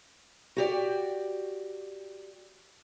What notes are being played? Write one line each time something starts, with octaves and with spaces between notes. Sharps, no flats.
F#4 G4 D5